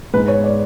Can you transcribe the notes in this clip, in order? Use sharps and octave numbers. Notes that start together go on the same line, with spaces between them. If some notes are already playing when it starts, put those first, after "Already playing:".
G#2 G#3 B3 B4
C#5
D5